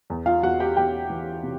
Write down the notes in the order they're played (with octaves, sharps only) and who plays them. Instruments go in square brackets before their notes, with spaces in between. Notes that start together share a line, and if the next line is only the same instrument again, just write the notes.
[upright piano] E2
F4 F5
E2 F#4 F#5
G4 G5
E2 G4 G5
E3
C3